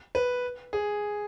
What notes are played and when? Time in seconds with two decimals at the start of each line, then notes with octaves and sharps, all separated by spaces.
0.15 B4
0.73 G#4